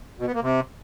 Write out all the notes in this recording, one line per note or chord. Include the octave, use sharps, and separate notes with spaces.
B2
B3
A#3
C3